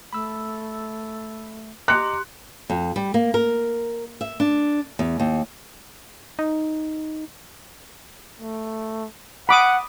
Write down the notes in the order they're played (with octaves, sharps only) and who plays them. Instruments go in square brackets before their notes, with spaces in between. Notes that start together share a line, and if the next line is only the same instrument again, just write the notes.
[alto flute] A3 [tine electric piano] B5 E6
[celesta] G4 C6 [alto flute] D#5 [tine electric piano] A#5 D6 [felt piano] F#6 C#7
[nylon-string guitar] F2
G3
A#3
A#4
E5
D4
E2
D#2
[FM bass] D#4
[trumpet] A3
[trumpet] F#5 [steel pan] B5 D6 D#6